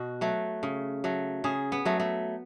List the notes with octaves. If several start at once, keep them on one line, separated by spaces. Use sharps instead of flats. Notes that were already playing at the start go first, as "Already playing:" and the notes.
Already playing: B2 F#4
F#3 A3
C#3
F#3 A3
C#3 G#4
B3
F#3 A3
A3